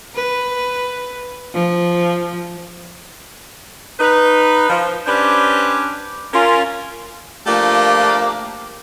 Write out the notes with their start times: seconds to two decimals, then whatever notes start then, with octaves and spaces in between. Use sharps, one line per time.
0.15 B4
1.54 F3
4.00 D#4 B4
4.69 F3
5.07 C#4 D4 G4 B4 C5 D5
6.33 C#4 F4 A#4
7.47 F3 A3 A#3 D4 F4 G4